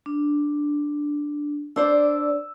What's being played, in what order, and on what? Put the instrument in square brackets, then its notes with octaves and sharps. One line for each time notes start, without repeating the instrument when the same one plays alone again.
[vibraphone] D4
[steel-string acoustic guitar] D4 C5 D5 [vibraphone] E6